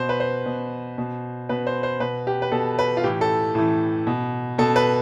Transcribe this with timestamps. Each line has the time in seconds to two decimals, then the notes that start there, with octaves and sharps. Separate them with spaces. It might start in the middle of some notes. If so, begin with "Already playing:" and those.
Already playing: B2 C5
0.09 B4
0.20 C5
0.45 B2
0.98 B2
1.49 B2 B4
1.67 C5
1.83 C5
2.00 B2 B4
2.27 G4
2.42 B4
2.52 B2 A4
2.79 B4
2.97 F4
3.04 A2 E3 G4
3.21 A4
3.55 A2 E3
4.07 B2
4.58 B2 A4
4.76 B4